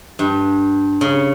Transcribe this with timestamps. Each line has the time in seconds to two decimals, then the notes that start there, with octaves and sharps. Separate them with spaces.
0.19 G2
1.01 C#3